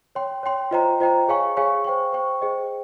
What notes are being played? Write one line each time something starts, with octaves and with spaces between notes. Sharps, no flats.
C#5 G5 C6
C#5 G5 C6
F4 C5 D#5 G5 A#5
F4 C5 D#5 G5 A#5
G#4 C#5 F5 G#5 C#6
G#4 C#5 F5 G#5 C#6
C5 G5 C#6
C5 G5 C#6
G#4 C5 D#5 G5